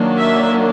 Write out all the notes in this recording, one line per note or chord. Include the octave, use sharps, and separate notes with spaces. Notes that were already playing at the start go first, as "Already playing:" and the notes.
Already playing: D#3 F#3 A#3 D4
E5